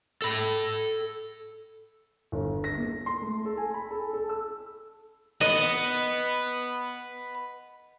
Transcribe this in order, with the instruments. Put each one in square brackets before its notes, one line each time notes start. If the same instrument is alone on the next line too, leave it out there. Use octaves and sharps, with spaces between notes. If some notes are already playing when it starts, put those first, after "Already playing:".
[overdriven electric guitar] A4 B5
[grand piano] G1
A#6
A#3
C6
A3
A4
G#5
B5
A4
A4
E6
[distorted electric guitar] B4 F#5 [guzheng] D#5